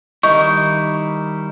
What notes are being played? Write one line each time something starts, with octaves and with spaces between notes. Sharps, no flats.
D#3 G3 D#4 E4 C#6